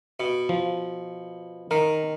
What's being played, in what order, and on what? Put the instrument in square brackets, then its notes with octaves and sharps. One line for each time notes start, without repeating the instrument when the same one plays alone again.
[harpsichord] B2
[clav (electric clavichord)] F3
[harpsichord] D#3 [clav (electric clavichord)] A#4